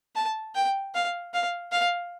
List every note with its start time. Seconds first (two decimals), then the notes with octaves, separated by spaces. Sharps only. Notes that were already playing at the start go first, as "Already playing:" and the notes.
0.15 A5
0.55 G5
0.95 F5
1.34 F5
1.72 F5